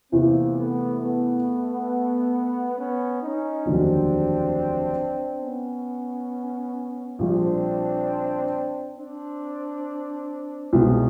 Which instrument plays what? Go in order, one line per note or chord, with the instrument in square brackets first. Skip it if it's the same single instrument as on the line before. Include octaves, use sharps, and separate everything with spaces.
[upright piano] E2 C3 E3 [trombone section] A#3 C4
[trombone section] A3 B3
A3 B3
B3 C#4
C#4 D#4
[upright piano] F1 D#2 D3 F#3 [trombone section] C4 D4
[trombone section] B3 C#4
[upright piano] A#1 A#2 G3 [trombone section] C4 D4
[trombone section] C4 D4
[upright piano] C2 B2 G#3 [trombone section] C#4 D#4